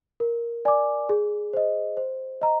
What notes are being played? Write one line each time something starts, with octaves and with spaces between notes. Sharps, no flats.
A#4
D5 G#5 D6
G#4
C5 D#5
C5
D#5 A#5